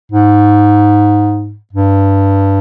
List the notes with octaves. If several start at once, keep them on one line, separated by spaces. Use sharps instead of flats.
G#2
G2